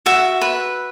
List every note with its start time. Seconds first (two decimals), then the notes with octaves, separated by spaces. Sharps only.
0.06 F#4 E5
0.41 B4